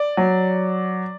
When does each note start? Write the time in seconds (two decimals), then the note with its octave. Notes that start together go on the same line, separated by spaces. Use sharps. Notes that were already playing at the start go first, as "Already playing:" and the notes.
Already playing: D5
0.17 F#3